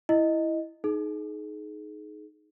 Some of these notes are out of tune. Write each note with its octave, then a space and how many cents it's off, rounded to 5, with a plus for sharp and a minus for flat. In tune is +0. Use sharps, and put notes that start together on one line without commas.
E4 +0 D#5 +0
D#4 +0 G#4 +30